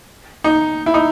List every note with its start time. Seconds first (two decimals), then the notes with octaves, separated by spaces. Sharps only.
0.44 D#4
0.86 E4
0.94 D#4